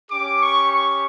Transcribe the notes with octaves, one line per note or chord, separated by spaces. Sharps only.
C#4 G4 D6
C#6
C#6